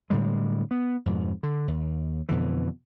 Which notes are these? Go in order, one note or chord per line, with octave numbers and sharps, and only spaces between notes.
A2 D3 G3 G#3
B3
F2 G#2 B2
D3
D#2
F2 B2 D3 E3